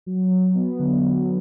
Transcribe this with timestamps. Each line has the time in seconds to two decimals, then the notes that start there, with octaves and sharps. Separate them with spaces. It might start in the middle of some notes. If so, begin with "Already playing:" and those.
0.06 F#3
0.31 F#3
0.55 B3
0.79 D3
1.04 F#3